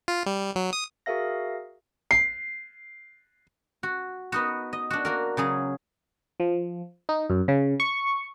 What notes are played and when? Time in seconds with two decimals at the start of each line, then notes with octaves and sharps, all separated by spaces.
0.08 F4
0.26 G3
0.56 F#3
0.73 D#6
1.06 F#4 G#4 A#4 E5 F5 A#6
2.11 C7
3.83 F#4
4.32 B3 D#4 F#4
4.73 D#5
4.90 D4 F#4
5.05 A#3 F#4 A#4
5.37 C#3 F#3 G#4
6.40 F3
7.09 D#4
7.30 F#2
7.48 C#3
7.80 C#6